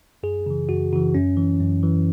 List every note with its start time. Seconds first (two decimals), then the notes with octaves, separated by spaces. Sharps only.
0.23 F#2 G#4
0.46 C#3 E3
0.69 F#2 F#4
0.92 C#3 E3 F#4
1.15 F#2 C#4
1.37 E3
1.60 F#2
1.83 E3